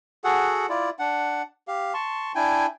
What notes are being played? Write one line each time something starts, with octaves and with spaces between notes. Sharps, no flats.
F#4 G#4 A4 F#5
E4 F4 D5
D4 F#5
G4 F5
A5 C6 C#6
D4 E4 G5 G#5